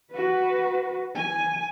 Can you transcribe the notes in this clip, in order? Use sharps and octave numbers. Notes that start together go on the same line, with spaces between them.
F#4 B4
G#5